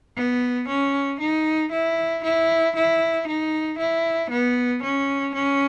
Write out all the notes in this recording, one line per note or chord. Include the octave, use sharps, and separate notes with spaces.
B3
C#4
D#4
E4
E4
E4
D#4
E4
B3
C#4
C#4